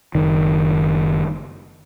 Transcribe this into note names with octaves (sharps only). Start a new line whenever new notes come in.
F#1 D#3